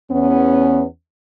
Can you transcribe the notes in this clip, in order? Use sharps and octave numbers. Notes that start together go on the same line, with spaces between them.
E2 B3 C#4